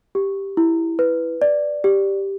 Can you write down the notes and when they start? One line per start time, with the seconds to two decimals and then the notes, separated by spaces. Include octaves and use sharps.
0.15 G4
0.57 E4
0.99 B4
1.42 D5
1.84 G4